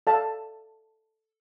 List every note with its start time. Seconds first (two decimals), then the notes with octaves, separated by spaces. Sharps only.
0.07 A4 D5 F5 A5